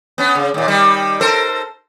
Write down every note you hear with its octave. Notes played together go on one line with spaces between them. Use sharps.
B3 C#4
C#3
D#2 A#2
D#3 G3
A4 A#4 C5